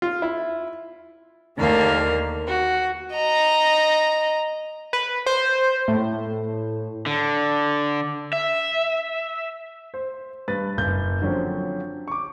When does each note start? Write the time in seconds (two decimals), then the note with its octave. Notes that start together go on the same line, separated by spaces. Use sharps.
0.02 F4
0.22 E4
1.58 D#2 D3 A3 A#3 F5
2.48 F#4
3.13 D#5 A#5
4.93 B4
5.26 C5
5.88 A2
7.06 D3
8.33 E5
9.94 C5
10.48 G2 B4 A6
10.77 F#1 G6
11.22 D3 F3 F#3 C4 C#4
12.08 C#6 D6